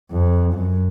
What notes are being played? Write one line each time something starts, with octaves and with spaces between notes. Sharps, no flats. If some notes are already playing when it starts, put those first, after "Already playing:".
F2
F#2